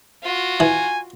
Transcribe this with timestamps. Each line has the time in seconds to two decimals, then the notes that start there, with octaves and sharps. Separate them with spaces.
0.23 F4 F#4
0.60 E3 G#5